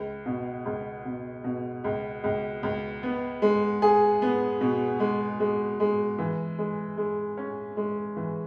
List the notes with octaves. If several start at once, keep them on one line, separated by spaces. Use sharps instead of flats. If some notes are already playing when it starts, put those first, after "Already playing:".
Already playing: C#2
B2
C#2
B2
B2
C#2
C#2
C#2
B3
G#3
G#4
B3
B2
G#3
G#3
G#3
E3
G#3
G#3
C#4
G#3
E3